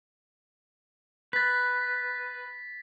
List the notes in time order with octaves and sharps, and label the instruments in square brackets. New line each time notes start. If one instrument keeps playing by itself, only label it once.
[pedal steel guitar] B4 [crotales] A6 B6